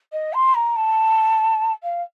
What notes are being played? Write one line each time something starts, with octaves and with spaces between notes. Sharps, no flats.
D#5
C6
A#5
A5
F5